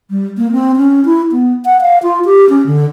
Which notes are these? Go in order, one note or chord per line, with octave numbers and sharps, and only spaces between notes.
G3
A#3
C4
C#4
E4
B3
F#5
F5
F4
G4
C#4
D3